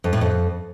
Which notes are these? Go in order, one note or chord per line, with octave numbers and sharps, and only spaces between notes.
F2
A2
F2